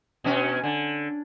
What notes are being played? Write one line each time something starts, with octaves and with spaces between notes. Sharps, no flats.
B2 C#4
D3